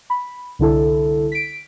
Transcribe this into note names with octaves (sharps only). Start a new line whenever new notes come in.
B5
C2 D3 E4 A4
B6 D7